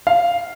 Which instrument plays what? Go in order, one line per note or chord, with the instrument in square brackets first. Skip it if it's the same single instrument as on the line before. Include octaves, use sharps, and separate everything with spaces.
[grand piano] F5